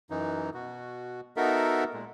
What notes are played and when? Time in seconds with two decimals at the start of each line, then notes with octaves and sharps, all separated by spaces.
0.10 F#2 E3 D#4
0.54 B2 F#4
1.37 B3 D#4 F#4 A4 A#4 E5
1.94 A#2 G#3